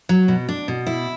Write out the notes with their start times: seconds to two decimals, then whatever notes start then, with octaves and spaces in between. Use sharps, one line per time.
0.09 F#3
0.28 B2
0.49 D4
0.68 B2
0.87 E4